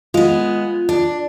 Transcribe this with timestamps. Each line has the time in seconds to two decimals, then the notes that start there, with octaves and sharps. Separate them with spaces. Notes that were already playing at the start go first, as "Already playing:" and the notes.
0.14 G#3 B3 F4
0.89 D4